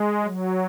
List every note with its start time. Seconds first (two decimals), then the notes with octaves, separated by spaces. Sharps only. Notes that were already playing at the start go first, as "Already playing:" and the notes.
Already playing: G#3
0.24 F#3